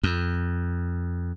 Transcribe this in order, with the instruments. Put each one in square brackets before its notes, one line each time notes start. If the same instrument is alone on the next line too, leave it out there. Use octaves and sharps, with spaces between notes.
[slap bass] F2